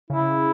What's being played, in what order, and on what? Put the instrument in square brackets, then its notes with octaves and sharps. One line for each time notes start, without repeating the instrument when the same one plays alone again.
[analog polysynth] C#3 [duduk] E4